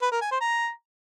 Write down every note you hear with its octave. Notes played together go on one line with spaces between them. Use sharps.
B4
A#4
G#5
C5
A#5